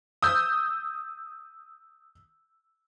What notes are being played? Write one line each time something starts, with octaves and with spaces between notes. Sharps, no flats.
D#6 E6 G6